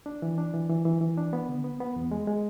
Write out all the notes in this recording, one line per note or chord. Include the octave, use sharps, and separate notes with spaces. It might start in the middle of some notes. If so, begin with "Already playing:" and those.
D4
E3
D4
E3
E3
E3
E3
D4
B3
D3
B3
B3
E2
G#3
G#3